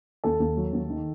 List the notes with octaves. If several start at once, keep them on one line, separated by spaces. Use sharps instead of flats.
D#2 A4
D#2
F#3
D#2
D#3